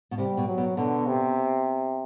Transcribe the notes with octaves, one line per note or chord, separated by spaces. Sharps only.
B2
C3 G3
B2
F#3
B2
B2 D3
C3